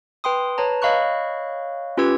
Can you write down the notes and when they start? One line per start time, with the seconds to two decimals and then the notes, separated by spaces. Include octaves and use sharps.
0.24 B4 G5 C6 D#6
0.58 B4 C#5 A5 A#5
0.82 C#5 D#5 F5 B5 C#6 F#6
1.97 C#4 F4 G4 B4 E6 G#6